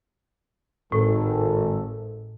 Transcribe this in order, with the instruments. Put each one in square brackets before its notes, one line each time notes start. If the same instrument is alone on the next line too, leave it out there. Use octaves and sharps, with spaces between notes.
[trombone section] G#1 A4 [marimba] A2